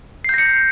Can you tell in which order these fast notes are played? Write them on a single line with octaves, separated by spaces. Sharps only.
C7 G6 A#6 C#7